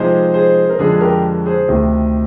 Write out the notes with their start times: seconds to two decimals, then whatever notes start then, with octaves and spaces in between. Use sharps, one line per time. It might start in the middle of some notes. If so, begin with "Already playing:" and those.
Already playing: C3 F3 G#3 D#4 G#4 C5
0.34 G#4 C5
0.69 A#4
0.79 F2 D3 F3 G#3 G#4
1.01 G4 A#4
1.46 G#4 C5
1.68 D2 C3 D#3